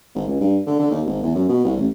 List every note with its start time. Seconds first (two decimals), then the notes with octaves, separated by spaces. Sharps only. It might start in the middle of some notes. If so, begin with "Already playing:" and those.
0.15 G#1
0.27 C#2
0.41 G2
0.66 D3
0.79 D3
0.91 D#2
1.06 G#1
1.22 E2
1.35 F#2
1.49 B2
1.64 C2
1.77 A1